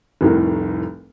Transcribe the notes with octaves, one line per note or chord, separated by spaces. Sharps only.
F1 C2 A2 A#4